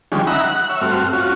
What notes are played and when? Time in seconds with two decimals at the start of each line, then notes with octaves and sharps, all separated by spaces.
0.12 D3 D#3 F3 G3 G#3 C#4
0.27 D#4 E5 F#5 A#5 B5
0.44 F#5
0.69 C#5 E5
0.81 G2 A3 C4 F#4 F6
1.13 C#4 F4 F#4